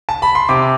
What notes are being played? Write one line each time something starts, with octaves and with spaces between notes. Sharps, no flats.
A5
B5
C6
C3 D6